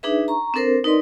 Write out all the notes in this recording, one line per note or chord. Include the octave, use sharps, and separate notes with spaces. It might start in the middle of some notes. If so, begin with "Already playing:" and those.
D4 D#4 G#4 B4 E5
A#5 C#6
C4 D4 A4 A#4 C5
D#4 A#4 B4 D5 D#5 C6